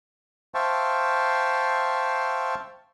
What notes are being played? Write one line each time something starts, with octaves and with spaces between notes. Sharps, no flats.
C5 E5 F5 G5 A5 C#6